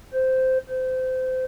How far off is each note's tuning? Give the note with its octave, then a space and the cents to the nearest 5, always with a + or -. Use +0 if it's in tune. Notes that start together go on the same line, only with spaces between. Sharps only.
C5 -10
C5 -25